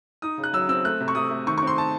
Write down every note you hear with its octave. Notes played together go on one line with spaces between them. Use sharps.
D#4 D#6
C#3
F#6
F#3 E6
C4 E6
A3 F#6
C3
C#6
C3 D#6
A3
D#3 C#6
C#6
C4 C6
A5